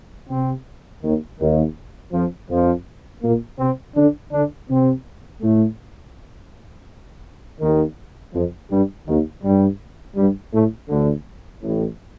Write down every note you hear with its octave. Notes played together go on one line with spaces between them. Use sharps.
C3 C4
D#2 D#3
D#2 D#3
F2 F3
F2 F3
A#2 A#3
C3 C4
D3 D4
D3 D4
C3 C4
A2 A3
D#2 D#3
F2 F3
G2 G3
D#2 D#3
G2 G3
G2 G3
A2 A3
D2 D3
A1 A2